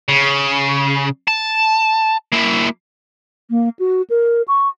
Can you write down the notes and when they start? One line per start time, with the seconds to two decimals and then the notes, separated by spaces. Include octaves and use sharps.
0.09 C#3
1.28 A5
2.32 A#3 E4
3.50 A#3
3.79 F#4
4.10 A#4
4.48 C#6